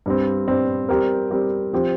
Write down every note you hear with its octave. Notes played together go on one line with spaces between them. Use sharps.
G2 G3 C4
G2 G3 C4
G3 C4 G4 A#4
G3 C4 G4 A#4
F3 C4 G4 C5